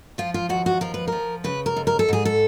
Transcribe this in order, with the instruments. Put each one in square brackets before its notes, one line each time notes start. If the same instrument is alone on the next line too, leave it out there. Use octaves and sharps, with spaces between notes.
[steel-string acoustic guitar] F3 F4
F4
D#2 F#4
F#4
F3 A#4
B4
F3 A#4
C#3 B4
A#4
D#2
A#4
A4
G#2 G#4
A4